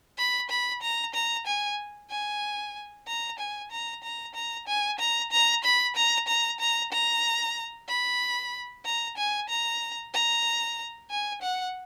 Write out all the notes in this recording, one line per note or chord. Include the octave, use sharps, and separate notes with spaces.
B5
B5
A#5
A#5
G#5
G#5
A#5
G#5
A#5
A#5
A#5
G#5
A#5
A#5
B5
A#5
A#5
A#5
A#5
B5
A#5
G#5
A#5
A#5
G#5
F#5